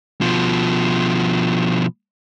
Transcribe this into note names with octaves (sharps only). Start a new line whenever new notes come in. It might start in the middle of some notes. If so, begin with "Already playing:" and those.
B2 F3